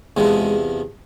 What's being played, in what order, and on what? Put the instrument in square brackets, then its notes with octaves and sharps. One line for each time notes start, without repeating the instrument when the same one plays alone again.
[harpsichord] E2 C3 F3 G#3